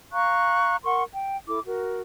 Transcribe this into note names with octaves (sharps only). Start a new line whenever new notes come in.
F5 A#5 C#6 F#6
A#4 F#5 C6 C#6
G5
E4 A4 D6
F#4 A#4